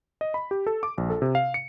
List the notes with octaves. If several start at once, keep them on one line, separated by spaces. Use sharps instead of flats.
D#5
B5
G4
A4
D6
A#1
A4
C3
F5
C#7